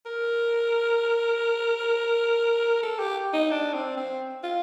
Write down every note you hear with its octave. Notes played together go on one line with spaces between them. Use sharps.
A#4
A4
G4
D#4
D4
C4
C4
F4